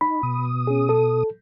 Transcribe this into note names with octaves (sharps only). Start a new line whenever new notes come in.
D#4 B5
B2 D#6
C#4 G#4
A4